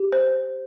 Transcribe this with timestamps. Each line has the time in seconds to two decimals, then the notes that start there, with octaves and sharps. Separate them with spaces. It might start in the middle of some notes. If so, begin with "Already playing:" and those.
Already playing: G4
0.12 C5